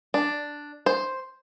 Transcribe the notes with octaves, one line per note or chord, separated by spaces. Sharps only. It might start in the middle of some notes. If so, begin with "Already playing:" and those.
D4
C5